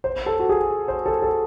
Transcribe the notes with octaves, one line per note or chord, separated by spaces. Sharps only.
C5
A4
F#4
G#4
C5
A4
A4